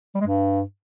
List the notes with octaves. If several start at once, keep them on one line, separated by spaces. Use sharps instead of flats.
G3
G#3
G2